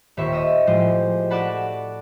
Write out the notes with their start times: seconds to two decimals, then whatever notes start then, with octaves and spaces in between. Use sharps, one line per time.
0.17 D#1 G4 C5 E5 C#6
0.33 D#5 E5 D#6 E6
0.67 A2 F3 G#3 G4 C5 D#7
1.30 F#4 A4 D5 F#5 A5 B5